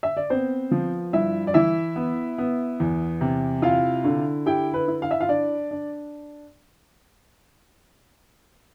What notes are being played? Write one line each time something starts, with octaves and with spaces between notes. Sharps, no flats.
E5
D5
B3 C4 C5
F3
G2 E4 E5
D5
E3 E4 E5
B3
B3
E2
C3
E4 F4 F5
D3
E4 G4 G5
B4
E4
F5
E5
F4 F5
D4 D5
D4